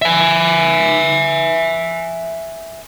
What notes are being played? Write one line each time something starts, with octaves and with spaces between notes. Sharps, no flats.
E5 G#5